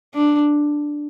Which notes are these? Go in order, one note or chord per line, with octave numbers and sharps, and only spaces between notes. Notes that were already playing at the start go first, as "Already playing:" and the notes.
D4